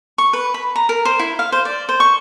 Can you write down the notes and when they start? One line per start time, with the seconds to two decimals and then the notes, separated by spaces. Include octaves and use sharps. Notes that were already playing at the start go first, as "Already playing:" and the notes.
0.18 C#6
0.33 B4
0.54 B5
0.76 A#5
0.89 A#4
1.05 C5
1.19 E4
1.39 F5
1.52 C5
1.65 D5
1.89 C5
2.00 C#6